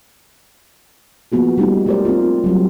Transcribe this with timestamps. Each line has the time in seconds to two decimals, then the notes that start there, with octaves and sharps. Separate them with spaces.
1.32 F3 A#3 B3 F#4 G#4
1.58 G3 A3 B3 C#4 D#4
1.86 G#3 A3 G4 A#4 C5 D5
2.05 C4 F4
2.44 F#3 G3 F#4